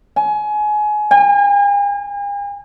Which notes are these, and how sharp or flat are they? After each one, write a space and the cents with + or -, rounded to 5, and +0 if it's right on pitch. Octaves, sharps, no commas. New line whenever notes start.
G#5 +25
G#5 -45